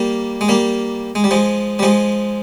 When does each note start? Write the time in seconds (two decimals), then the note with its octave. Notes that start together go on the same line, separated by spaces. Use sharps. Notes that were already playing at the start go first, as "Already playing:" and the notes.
Already playing: G3 A#3
0.41 G#3
0.48 G3 A#3
1.15 G#3
1.24 G3
1.31 F3 G#3
1.79 G3
1.83 F3 G#3